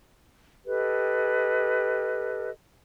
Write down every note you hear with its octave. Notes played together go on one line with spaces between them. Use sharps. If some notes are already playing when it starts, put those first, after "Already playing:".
G4 A4 B4 D#5